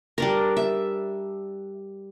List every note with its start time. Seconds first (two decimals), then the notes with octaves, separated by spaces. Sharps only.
0.18 G3 D4 A#4
0.57 E5